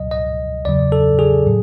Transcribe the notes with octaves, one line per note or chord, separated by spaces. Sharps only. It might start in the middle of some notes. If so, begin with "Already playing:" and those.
Already playing: C#2 B2 F#3 D#5
D#5
E2 C#3 F#3 D5
A4
G#4
A2 F#3